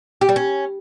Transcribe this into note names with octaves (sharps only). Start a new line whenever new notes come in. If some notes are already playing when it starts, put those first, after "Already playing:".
G4
G3
C#4